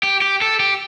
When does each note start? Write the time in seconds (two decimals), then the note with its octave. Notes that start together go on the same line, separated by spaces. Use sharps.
0.03 G4
0.22 G4
0.42 A4
0.60 G4